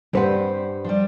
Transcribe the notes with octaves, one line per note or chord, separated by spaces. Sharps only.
G2 G3 C4 B4 C5 F#5
F3 G3